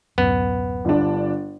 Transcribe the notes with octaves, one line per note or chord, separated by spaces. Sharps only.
D1 F#2 B3
G1 D4